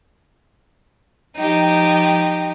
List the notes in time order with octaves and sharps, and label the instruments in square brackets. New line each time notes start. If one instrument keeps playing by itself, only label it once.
[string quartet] F3 D#4 G4